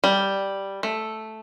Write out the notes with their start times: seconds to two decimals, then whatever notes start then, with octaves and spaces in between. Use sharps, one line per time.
0.04 G3
0.83 A3